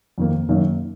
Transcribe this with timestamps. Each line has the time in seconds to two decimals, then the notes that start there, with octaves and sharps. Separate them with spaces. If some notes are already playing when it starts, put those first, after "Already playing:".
0.18 F2 D#3 A#3
0.49 F#2 D#3 A#3 D#4